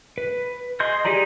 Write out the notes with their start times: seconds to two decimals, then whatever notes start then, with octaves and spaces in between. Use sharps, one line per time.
0.18 B4
0.80 G#4 D#5 C6 G6
1.05 D#4 G4 G#4 D5 A#5